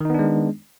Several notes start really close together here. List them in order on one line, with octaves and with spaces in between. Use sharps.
D#3 D#4 B3 D4 G#3